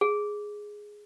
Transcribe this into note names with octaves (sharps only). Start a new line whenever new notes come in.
G#4